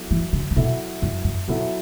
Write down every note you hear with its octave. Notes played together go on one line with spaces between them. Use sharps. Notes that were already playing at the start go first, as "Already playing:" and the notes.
Already playing: F#3 B3 E4 A4 E5
E3
D3
D3
B2 F#3 B3 E4 A4 E5
F#2
F#2
B2 F#3 B3 E4 A4 E5